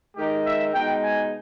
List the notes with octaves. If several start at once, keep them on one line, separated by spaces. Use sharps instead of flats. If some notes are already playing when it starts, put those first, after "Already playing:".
D#3 G#3 D#4 G4
E5
B2 G#3 D#4 G5
G#5